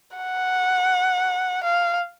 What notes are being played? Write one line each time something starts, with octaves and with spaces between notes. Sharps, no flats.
F#5
F5